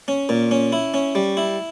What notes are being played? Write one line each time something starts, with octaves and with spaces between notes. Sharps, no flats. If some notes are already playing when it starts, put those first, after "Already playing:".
C#4
A#2
C#4
E4
C#4
G3
E4